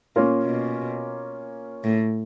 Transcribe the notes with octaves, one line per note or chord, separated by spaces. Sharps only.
A#2 A#3 C#4 F4 A#4
B2
A2